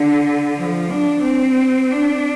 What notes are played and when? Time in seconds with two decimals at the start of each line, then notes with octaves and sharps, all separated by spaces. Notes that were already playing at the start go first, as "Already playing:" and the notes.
Already playing: D3
0.57 F3
0.90 D4
1.24 C4
1.91 D4